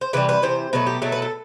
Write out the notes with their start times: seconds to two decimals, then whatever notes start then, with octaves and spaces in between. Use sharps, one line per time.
0.01 C5
0.13 C3 E3 G3 B4
0.29 B4
0.42 C3 E3 C5
0.73 B2 F#3 A3 B4
0.87 G4
1.02 B2 F#3 A3 A4
1.12 B4
1.22 A4